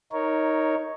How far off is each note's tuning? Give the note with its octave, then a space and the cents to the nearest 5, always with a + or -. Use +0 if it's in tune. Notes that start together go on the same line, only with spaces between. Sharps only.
D#4 +15 A#4 +0 C#5 +0